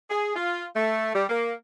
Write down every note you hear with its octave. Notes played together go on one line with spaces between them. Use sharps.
G#4
F4
A3
G3
A#3